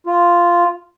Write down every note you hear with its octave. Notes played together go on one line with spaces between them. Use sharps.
F4